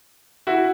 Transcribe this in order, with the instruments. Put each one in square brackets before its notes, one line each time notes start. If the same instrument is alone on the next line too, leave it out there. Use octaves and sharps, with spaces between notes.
[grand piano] E4 F#4